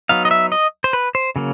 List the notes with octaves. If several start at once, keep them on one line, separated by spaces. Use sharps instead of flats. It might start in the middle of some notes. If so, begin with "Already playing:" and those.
F#3 B3 D#4 F5
D#5
E5
D#5
C5
B4
C5
C#3 F#3 A#3